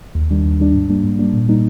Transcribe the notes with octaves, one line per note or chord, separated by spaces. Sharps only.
D#2
D#3 G3 D4
D#2
D#3 G3 D4
G#2
G3 A#3 D4
G#2
G3 A#3 D4
A#2
G3 A#3 D#4